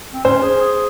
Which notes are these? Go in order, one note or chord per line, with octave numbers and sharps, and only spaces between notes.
C4
C#4 C5
G#4
G#4